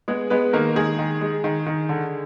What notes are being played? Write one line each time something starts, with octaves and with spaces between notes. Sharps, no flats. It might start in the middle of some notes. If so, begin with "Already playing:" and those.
G#3 B3 G#4
G#3 B3 B4
D#3 A#3 A#4
D#3 G#3 G#4
D#3
G#3
D#3
D#3
D3